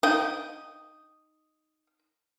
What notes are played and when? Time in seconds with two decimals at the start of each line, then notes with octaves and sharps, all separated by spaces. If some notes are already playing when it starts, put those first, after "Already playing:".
0.03 D#4 G5 D#6